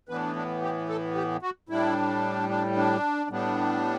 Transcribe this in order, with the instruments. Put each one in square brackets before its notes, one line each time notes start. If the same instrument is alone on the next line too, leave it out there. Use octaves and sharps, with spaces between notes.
[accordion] A2 E3 B3 D4 B4
D4
G4
A4
G4
F#4
A2 G3 D4 E4
D4
D4
A2 G3 B3 D4